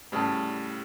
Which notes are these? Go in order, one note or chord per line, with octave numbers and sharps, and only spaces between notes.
A2 C#3 G3 B4 D5 A5